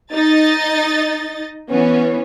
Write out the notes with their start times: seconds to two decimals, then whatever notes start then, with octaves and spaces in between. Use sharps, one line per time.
0.13 D#4 D#5 A6
1.71 E3 B3 C#4